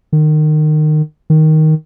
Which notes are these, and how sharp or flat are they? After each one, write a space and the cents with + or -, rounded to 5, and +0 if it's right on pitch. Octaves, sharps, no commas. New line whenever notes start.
D#3 -25
D#3 +5